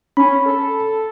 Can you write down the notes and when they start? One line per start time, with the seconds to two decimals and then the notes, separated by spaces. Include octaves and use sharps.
0.17 C#4 B5
0.46 A4